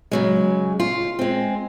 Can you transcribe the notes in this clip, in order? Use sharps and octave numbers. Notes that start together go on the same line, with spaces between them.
C#3 F#3 G#3
F4
G#3 C4